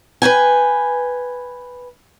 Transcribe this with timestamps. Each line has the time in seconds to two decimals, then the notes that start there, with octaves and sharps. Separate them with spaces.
0.22 B4 C5 G5 G#5